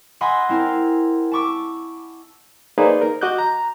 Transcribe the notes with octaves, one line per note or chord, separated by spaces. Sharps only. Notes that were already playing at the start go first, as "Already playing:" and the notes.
D#5 F#5 G#5 B5 C6 E6
C4 E4 A#4 C5
A5 B5 C#6 D6 E6
A#3 D#4 G#4 B4 C5 D5
A#4
F#4 D#5 D6 F#6 G6
A#5